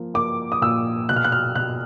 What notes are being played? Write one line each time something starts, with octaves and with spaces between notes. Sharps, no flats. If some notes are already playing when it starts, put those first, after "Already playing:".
Already playing: F3 A#3
A#3 D6
D#6
A#2 E6
B2 F#6
F6
F#6
F6
B2 F#6